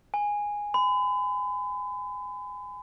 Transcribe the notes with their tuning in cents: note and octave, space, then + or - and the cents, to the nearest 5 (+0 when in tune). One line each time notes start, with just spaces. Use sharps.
G#5 -10
B5 +40